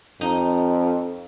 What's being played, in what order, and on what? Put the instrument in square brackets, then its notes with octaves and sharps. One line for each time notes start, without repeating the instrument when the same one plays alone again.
[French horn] F2 [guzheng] D#4